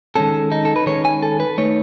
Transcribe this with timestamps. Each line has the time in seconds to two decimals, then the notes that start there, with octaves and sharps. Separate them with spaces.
0.16 D#3 G#3 C#4 A4
0.52 D#4
0.65 A4
0.76 B4
0.86 D#3 G#3 C#4 C#5
1.05 G#5
1.23 A4
1.40 B4
1.58 D#3 A3 D#4 C#5